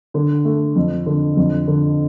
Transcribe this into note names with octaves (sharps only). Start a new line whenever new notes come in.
D3
A3
F2
D3
F2
D3